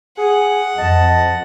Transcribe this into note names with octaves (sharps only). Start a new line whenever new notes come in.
G#4 F#5
F2 D#5 A5